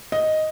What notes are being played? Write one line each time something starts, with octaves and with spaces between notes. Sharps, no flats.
D#5